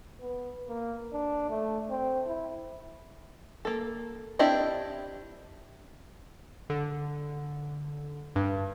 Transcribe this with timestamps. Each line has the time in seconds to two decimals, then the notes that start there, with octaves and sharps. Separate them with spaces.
0.20 B3
0.68 A#3
1.13 D4
1.49 A3
1.90 C4
2.27 E4
3.65 A#3 A4
4.39 C4 D4 E4 G4 D#5
6.70 D3
8.36 G2